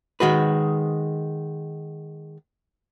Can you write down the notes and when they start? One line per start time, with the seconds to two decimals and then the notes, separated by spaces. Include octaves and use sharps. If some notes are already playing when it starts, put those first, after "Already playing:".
0.20 D#3 G#3 F#4 B4